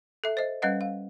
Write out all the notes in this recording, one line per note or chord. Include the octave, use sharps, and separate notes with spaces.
A4 E5
C5 D#5
G3 C#4 B4 D#5 F#5
F5